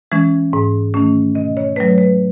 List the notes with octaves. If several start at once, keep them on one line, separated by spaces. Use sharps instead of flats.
E3 G#3 C#4
G#2
D#3 A3 C#4
B2 D#5
C#5
F#3 A3 B4
C#5
B4